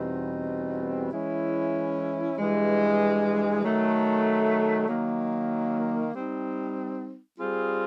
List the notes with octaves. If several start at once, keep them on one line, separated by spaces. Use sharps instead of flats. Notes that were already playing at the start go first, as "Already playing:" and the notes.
Already playing: E2 B2 G3 C4 D#4
E3 G#3 C#4 E4
G2 E3 G#3
D#3 F#3 A3
D#3 F#3 A#3
G3 C4 D#4
G3 C4 F4 G#4